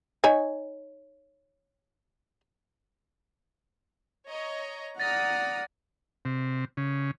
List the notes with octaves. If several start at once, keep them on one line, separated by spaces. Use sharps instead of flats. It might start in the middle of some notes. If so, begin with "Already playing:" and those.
D#4 C#5 G#5
C#5 D#5 A#5
D5 F#5 A#5 D#6 F6 A6 A#6
C3
C#3